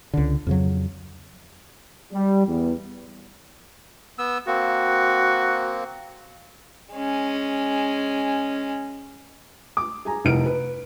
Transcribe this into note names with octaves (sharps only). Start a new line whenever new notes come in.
C#2 D3
F2 C#3 F#3
G3
E2
B3 E6
A#3 C4 F#4
G#3 C#4
D6
G#4 G#5 A#5
F1 C2 F6 D7
B4